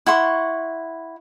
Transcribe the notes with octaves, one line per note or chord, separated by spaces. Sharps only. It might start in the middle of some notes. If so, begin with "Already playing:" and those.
E4 F#5 C6 C#6